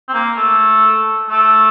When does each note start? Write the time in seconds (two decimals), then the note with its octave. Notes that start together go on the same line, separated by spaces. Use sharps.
0.09 C4
0.14 A#3
0.37 A3
1.29 A3